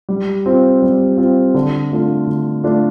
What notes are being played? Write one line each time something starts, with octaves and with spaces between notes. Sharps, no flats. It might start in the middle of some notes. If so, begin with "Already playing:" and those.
G3
C4 F4
G3
C4 F4
D3
A3 D4 F4 A4
D3
A3 D4 F4 A4